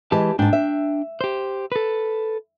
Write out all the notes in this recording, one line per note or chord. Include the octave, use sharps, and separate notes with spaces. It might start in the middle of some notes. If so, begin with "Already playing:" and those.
E3 G#3 G4 A5
G#2 D4 G5 A5
E5
G4 C5
A4 B4